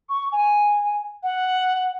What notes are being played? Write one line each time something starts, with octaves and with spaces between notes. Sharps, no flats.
C#6
G#5
F#5